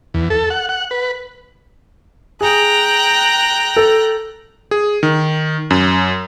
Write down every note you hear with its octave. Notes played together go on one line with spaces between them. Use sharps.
E2
A4
F#5
F#5
B4
G#4 G5 A#5 F#6
A4
G#4
D#3
F#2